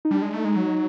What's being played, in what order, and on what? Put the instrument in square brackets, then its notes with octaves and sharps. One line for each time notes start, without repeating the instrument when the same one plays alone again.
[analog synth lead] D#4
[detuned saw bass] G3 [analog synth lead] D4
[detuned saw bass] G#3
[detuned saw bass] A3 [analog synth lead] D#4
[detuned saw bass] G#3
F#3